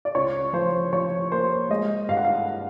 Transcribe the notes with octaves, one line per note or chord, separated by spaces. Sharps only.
D5
C#2 C#5
F3 C5
F3 C#5
A#3 C5
G#3 D#5
G2 F5
F#5
F5